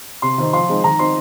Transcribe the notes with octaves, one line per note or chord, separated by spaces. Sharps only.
C3 C6
D#3 C4 D#4
F3 C6
G#3 C4 D#4
D#3 A#5
C4 D#4 C6